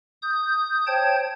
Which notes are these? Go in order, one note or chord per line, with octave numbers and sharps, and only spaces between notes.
D#6 G6
C5 C#5 G5 A5 G#6